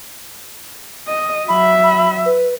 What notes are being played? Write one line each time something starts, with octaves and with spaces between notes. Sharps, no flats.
D#5
F#3 E5 B5
B5
B4